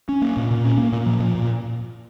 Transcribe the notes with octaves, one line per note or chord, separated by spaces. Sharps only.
C#4
A#3
A#2
A#2
C#4
A#3
A#2
F3
A#2
A#2